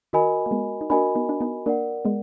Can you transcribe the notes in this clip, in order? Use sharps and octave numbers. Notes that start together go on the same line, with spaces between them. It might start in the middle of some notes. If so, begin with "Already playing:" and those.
D#3 F#4 A#4 D#5 G#5 B5
A#3
G#3 B3
D#4
A#3 D4 F#4 A#4 D#5 G#5 B5
B3 D#4
D4
B3 D#4
A#3 D4 A#4 D5 F#5
G#3 B3